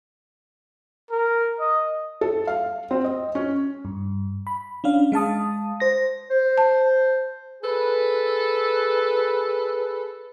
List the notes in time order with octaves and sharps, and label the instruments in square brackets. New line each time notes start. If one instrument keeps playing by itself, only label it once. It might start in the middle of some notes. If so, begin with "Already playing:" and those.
[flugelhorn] A#4
D#5
[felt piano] A4
F5
C4
D#5
C#4
[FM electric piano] G2
B5
C#4 D4 F5
G#3 F5 A5 D#6
C5 A#6
[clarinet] C5
[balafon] A5
[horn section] G#4 A4 B4